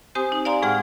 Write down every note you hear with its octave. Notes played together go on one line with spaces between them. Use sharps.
C4 G4 C5 G#5 D#6
D#4
D5 F5 G#5 A#5 C6
A2 G#3 G#4 F#5 G5 F6